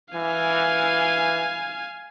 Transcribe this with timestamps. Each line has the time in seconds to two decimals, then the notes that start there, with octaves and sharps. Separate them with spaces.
0.14 E3 F5 G#5